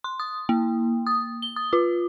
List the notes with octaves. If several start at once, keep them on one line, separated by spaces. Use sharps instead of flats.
C6
D#6
A#3
D#6
G7
D#6
F4